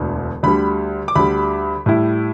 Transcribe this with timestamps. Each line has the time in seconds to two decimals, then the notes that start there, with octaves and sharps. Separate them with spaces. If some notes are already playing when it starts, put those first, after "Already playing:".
Already playing: E1 D2 D3
0.43 D2 D3 G3 B5
1.08 D6
1.15 D2 D3 G3 B5
1.86 A2 G3 E4